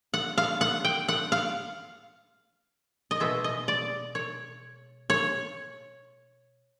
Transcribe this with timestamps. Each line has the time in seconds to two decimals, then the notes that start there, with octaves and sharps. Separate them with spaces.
0.14 F#5
0.38 F5
0.61 F#5
0.85 G5
1.09 F#5
1.32 F5
3.11 D#5
3.20 B2 G#3 E5
3.44 D#5
3.68 D5
4.15 C#5
5.10 C#5